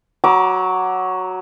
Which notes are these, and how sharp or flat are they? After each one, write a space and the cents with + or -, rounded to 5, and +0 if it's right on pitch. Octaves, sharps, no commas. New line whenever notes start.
F#3 +0 A#5 +45 D6 +0